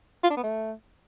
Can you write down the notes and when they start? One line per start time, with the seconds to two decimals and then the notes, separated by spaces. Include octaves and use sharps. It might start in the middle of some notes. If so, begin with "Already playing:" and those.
0.23 F4
0.30 D4
0.37 B3
0.43 A3